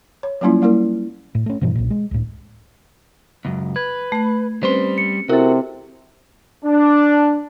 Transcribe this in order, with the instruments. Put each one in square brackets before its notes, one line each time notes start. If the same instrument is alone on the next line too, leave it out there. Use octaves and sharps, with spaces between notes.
[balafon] C#5
F#3 G3 A#3 C#4 E4 F4
G3 A#3 E4 A#4
[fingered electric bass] A2
A3 C#4
G2 B2 E3 F3
B1 A#2
G#3
C#2 A2
[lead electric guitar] C#2 F#2
[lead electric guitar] B4 [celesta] G#6
[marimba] A3 B5
[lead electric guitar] G3 C6 [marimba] C4 C#4 B4 [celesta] C5
[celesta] C#7
[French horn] C3 [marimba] E4 A4 [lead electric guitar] F#4 [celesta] A#4
[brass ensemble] D4